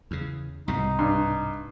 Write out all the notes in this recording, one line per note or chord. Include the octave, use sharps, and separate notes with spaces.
E2 C#3
C2 G#2 B2 D#4
G2